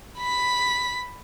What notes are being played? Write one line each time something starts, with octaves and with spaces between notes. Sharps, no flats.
B5 B6